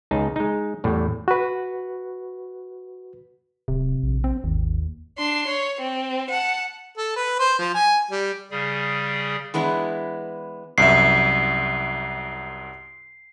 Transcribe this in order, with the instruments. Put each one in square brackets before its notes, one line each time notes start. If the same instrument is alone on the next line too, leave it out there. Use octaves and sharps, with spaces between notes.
[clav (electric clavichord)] C#2 D#4 G#4 A5
G#3 D#4
E2 A2 G3
[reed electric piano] F#4 B4
[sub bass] D1 [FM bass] C3
[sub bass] A#1
[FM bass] C4
[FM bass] G#1 [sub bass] D#2
[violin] D4 C6
C#5
C4
F#5 A5
[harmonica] A4
B4
C5
F3
G#5
G3
[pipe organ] C#3 G3 G#4
[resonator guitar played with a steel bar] E3 G#3 B3 D4 E4
[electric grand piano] C2 F#2 E5 [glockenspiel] C7